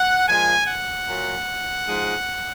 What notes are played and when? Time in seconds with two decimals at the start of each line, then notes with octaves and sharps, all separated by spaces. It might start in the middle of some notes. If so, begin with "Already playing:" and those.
Already playing: F#5
0.28 A#2 F3 G#3 G#5
0.67 F#5
1.06 A#2 F#3
1.85 G#2 F3 G#3